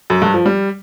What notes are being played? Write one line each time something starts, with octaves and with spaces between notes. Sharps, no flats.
F#2
G2
F3
G3